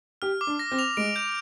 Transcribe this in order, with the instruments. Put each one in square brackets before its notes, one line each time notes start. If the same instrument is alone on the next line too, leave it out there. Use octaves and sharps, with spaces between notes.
[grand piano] G4 [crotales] F6
[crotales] D6
[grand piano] D4
[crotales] A#6
[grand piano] C4
[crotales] F7
[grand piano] G#3 [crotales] D7
[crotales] G6